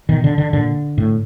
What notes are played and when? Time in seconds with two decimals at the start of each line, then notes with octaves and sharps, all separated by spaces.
0.09 B2 D#3
0.24 D3
0.38 D3
0.53 A#2 D3
0.98 A2